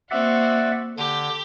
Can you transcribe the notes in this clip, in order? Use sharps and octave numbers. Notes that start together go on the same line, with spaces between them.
A#3 C4 F#4 D5 E5 F#5
D3 G4 G6